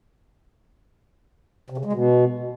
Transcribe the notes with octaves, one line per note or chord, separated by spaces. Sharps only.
C3
C#3
G#3
B2